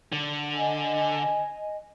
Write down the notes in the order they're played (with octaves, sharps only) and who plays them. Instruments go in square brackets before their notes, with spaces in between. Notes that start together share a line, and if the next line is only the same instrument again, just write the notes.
[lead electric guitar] D3
[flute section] D#5 G#5